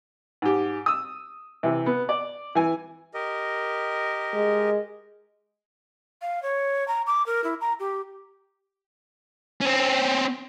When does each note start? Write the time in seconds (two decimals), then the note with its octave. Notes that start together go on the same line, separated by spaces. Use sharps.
0.42 G#2 G4
0.86 D#6 E6
1.63 C3 E3
1.86 B3
2.09 D5
2.55 E3 G#5
3.14 G4 A#4 D#5
4.33 G#3
6.22 F5
6.43 C#5
6.88 A#5
7.07 D6
7.26 A#4
7.44 E4
7.61 A#5
7.80 G4
9.61 C4 C#4